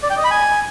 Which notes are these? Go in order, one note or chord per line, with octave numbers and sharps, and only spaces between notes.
D5
G5
D#5
B5
G#5